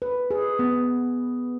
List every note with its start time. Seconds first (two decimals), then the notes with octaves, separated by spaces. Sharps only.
0.02 B4
0.31 G#4
0.59 B3